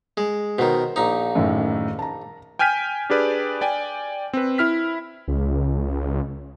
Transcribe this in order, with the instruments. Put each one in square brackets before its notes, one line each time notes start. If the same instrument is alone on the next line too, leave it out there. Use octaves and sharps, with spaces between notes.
[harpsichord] G#3
[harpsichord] B2 D#3 [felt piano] C5
[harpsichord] A#1 D#4
[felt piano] F#2 A2 D#3
A5 A#5
[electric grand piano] G5 G#5 F6 G6 B6 D#7
D4 G4 G#4 B4 D5
D5 G5 G#5
C4 B4
E4 F6 B6
[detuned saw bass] C#2